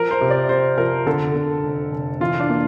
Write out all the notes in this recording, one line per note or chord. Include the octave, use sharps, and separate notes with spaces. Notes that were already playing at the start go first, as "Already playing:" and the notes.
Already playing: F3 A#4
C5
C3
D5
C3 C5
F3 A#4
D3 A4
D3
F1
F1
E3 F4
D4
A#3